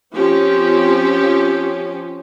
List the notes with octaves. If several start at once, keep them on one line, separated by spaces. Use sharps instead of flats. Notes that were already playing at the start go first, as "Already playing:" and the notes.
F3 C4 C#4 G4